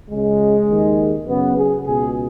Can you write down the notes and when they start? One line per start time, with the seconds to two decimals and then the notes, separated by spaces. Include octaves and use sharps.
0.10 C#2 C#3 G#3
0.69 D#2 D#3
1.27 F#2 C#3 B3
1.57 G#4
1.85 C#2 B2 G#4